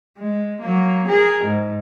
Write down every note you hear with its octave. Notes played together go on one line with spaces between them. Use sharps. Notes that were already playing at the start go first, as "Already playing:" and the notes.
G#3
F#3 A#3
G#4 A#4
G#2